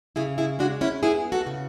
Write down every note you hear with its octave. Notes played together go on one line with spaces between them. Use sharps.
C#3 E4 G#4
E4 G#4
G#3 D4 F#4
C#4 E4
B3 E4 G#4
F#4 A4
C#3